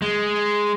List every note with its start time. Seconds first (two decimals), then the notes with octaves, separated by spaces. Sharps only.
0.02 G#3